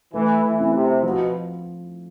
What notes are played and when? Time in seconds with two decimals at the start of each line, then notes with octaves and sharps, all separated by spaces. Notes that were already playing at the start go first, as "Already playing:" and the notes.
0.14 E3 A3
0.44 E3
0.59 C4 E4
0.74 C3
1.03 B2 F3